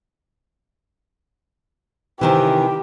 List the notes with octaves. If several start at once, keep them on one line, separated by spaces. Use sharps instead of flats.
C3 D#3 E3 G4